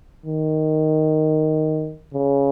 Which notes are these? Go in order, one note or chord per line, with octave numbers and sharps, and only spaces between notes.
D#3
C#3